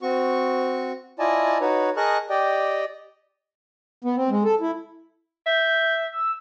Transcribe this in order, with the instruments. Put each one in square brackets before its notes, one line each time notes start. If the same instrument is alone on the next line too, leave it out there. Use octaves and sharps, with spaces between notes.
[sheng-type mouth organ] C4 F#4 C#6
E4 F4 D5 D#5 G#5 A5
D#4 F#4 B4 C#5
G#4 A#4 D#5 A5 C#6 F#6
G4 D5 D#5 G5
[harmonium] B3
C4
G#3
A4
E4
[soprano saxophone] E5 [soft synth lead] G6
[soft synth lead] E6